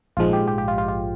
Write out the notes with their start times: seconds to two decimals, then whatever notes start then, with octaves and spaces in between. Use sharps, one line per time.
0.17 A#1 G#2 F3 G#3 F4
0.33 G4
0.48 G4
0.58 G4
0.68 F4
0.78 F4
0.88 F4